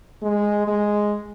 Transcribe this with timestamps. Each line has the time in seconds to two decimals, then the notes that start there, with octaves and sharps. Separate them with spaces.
0.22 G#3
0.67 G#3